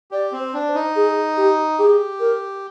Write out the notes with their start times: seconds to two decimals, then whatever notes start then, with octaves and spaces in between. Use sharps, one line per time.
0.11 G4 D5
0.32 C4
0.39 C5
0.54 D4
0.68 C5
0.75 D#4
0.96 G#4
1.37 G4
1.79 G4 G#4
2.20 A#4